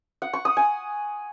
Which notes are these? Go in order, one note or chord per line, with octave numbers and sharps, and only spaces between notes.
F#5
C#6
D#6
G#5